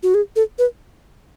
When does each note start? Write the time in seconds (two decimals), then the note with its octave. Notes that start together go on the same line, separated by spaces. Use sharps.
0.03 F#4
0.14 G#4
0.36 A4
0.59 B4